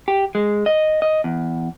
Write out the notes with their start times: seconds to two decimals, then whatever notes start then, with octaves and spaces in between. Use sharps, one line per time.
0.08 G4
0.35 G#3
0.66 D#5
1.02 D#5
1.24 E2